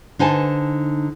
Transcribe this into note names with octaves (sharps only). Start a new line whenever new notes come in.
D3 D#4 C5 G#5 A5